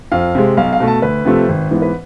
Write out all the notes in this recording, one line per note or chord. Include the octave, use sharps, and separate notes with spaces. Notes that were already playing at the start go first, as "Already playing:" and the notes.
F2 F5
C3 G#3
B1 F5
F5
B2 A3
A5
D2 B4
C3 F3 A3 C4
G#1
G#2 E3 B3
B4